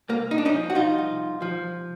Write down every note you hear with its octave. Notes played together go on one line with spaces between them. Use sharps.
C2 A#3
D#4
D4
C#4 D#4
F3
F#4
D#4 F4
C2
F3